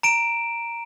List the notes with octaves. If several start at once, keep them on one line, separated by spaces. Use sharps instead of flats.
A#5 D7 E7